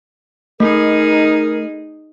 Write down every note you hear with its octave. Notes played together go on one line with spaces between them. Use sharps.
A3 D#4 G#4 A#4